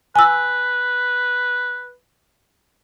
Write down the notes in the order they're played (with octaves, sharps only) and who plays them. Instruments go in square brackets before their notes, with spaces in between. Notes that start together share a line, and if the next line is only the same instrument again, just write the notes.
[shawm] B4 [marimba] G#5 E6